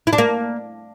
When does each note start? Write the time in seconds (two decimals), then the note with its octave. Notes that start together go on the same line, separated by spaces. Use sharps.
0.07 E4
0.13 D4
0.18 A#3